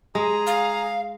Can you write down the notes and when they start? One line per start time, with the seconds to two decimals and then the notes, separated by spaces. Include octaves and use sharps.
0.15 G#3 G#4 A#5
0.47 F5